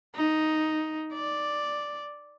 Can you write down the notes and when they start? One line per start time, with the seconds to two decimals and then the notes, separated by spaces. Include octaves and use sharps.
0.16 D#4
1.13 D5